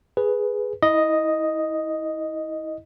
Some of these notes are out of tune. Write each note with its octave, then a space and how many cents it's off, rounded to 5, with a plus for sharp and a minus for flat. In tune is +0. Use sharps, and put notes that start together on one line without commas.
G#4 +0 B4 +0
E4 -30 D#5 +0